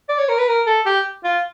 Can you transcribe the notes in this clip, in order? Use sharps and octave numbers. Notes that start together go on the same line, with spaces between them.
D5
C#5
A#4
B4
A#4
A4
G4
F4